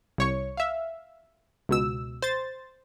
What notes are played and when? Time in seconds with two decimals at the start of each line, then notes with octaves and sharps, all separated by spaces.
0.18 C2 C#5 C#6
0.57 E5 F5
1.69 C#2 B2 E6
2.22 C5 A6